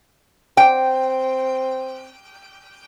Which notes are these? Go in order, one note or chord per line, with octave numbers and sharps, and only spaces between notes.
C4 G5